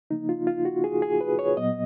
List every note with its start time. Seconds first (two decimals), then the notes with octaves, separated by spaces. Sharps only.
0.10 C#3 F3 A#3 D#4
0.29 F4
0.47 F4
0.65 F#4
0.84 G#4
1.02 G#4
1.21 B4
1.39 C#5
1.57 A#2 F#3 B3 D#5